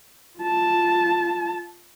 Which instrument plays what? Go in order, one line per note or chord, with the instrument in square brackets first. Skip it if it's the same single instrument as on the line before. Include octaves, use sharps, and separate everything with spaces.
[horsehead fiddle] F4 A5